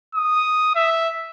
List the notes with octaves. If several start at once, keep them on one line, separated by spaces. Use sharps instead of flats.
D#6
E5